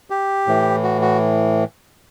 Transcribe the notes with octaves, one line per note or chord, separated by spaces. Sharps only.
G4
A2 E3
F#4
F#4